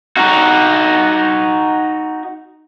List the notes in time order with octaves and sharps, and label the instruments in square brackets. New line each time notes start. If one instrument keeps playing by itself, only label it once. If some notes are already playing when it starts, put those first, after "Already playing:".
[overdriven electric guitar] D#4 F#4